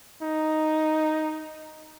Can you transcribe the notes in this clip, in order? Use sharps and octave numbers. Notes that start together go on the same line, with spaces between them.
D#4